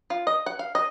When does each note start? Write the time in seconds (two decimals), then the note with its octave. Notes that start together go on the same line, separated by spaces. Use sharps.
0.10 F4
0.27 D#5
0.46 F#5
0.59 F5
0.75 D#5